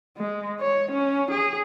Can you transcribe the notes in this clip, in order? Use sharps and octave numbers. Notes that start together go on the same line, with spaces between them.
G#3
C#5
C#4
G#4